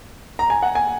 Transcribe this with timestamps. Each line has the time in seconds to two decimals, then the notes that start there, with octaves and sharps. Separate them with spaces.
0.39 A#5
0.50 G#5
0.63 F#5
0.75 G#5